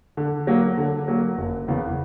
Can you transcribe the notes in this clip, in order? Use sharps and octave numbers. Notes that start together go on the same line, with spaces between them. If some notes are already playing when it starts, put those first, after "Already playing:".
D3
F#3 A#3
D3
F#3 A#3
F#1
E2 C#3 E3 B3